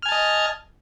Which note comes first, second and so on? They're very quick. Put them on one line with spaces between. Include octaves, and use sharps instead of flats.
F6 G#5 A5 D#5